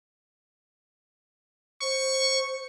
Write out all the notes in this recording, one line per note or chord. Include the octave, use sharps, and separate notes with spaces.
C5 C#6